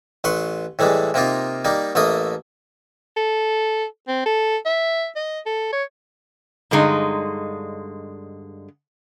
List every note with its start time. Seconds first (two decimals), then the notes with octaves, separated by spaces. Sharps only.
0.24 A1 B4 C6 C#6
0.79 A2 E3 G3 G#3
1.14 C3 A#3 D#4 F4
1.65 G3 A#3 D#4
1.95 A1 A3 A#3 D#5 D#6
3.17 A4
4.08 C4
4.26 A4
4.66 E5
5.16 D#5
5.46 A4
5.72 C#5
6.71 G2 D3 G#3 D#4